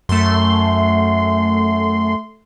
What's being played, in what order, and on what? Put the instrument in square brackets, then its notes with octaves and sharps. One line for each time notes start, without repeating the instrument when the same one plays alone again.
[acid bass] F#2 [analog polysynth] A3 C6